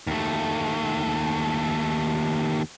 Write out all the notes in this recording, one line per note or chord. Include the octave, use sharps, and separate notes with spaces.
D#2 A3